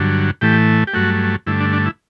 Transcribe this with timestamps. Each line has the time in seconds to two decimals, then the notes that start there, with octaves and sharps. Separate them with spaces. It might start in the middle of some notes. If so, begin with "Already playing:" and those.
Already playing: G2 D3 F#3
0.41 A2 E3 A3 G4
0.87 G4
0.94 G2 F#3 A3 F#4
1.46 G2 D3 A3 E4
1.61 D4
1.73 D4
1.86 E4